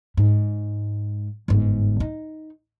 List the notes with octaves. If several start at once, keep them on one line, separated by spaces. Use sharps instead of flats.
G#2
G1 G#2
D#4